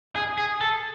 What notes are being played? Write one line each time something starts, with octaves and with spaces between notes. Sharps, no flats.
G#4
G#4
A4